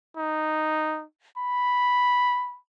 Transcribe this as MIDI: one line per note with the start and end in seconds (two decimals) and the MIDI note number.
0.17 1.04 63
1.37 2.58 83